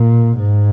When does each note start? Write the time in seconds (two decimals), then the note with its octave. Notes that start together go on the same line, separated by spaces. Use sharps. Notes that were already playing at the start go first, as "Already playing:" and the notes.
Already playing: A#2
0.37 G#2